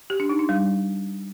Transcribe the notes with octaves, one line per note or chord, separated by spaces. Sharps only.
G4
D4
D#4
D4
G3